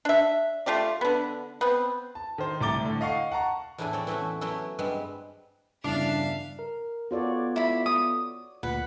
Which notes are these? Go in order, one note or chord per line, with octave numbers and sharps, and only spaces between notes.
D4 E5
A3 F4 G4 D5
D3 B3
B3 C4
A5
D#3 C5
C2 A3 A#5 D6 A6 G7
A2 D3
D#5 F5 F#5 C#6 C7
F#5 A5 A#5 C#6
E2 A2 D4 E4 G#4 G#5
C4 C#5 D5 B5
E3 A3 C#4 F#4
F#3 A3 B3 C#4 E4
G2 G3 G#3 B3 C4
G1 E2 C#3 D4 E5 F5
A#4
B3 F4 F#4 A4 C#5 D5
E4 B5
D#6
D2 A#2 B4 F#5